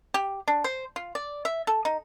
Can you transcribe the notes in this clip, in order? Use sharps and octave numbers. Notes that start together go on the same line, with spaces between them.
G4
D4
C5
F4
D5
E5
A4
D#4